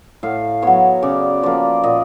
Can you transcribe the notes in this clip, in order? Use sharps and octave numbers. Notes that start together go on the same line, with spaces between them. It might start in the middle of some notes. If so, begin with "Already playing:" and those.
A2 F5
F#3 B3 C#5
C#3 D5
F3 A#3 D5
A#2 D#5